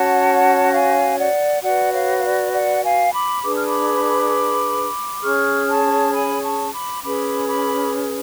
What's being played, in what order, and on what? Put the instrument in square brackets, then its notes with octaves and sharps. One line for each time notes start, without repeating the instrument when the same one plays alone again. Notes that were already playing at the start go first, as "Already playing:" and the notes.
Already playing: [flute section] C#4 F#4 C#5 F#5 A5
F5 G#5
D5 F#5
F#4 B4 D5 F#5
C#5 F5
F5
D5
D5 F#5
F5 G#5
B5 D6
D4 G#4 B4 D6
F6
B5 D6
C#4 G#4 C#5 C#6 F6
A5 C#6
G#5 B5
A5 C#6
B5 D6
C#4 G#4 B4 B5 D6
B5 D6